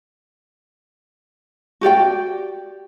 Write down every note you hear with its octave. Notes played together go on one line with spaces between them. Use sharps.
F#4 G4 D5 G5